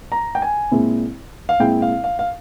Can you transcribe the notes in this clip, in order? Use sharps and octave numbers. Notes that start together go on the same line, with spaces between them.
A#5
G5
G#5
A#2 G#3 C4 E4
F5
A#2 G#3 C4 E4 G5
F5
F5
F5